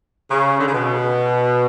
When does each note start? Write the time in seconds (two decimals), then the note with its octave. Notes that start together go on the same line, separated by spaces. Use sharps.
0.30 C#3
0.59 D3
0.66 C#3
0.73 B2